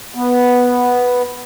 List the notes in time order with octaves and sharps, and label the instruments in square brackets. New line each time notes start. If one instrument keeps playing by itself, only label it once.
[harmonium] B3